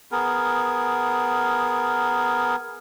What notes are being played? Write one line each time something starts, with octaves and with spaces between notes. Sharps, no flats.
B3 G#4 A#4